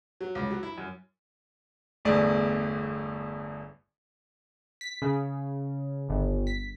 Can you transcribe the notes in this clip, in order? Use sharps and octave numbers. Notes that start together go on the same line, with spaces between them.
F#3
C#2
F#3
E4
F#2
G1 E2 A3 G#4 D5
B6
C#3
G1
B6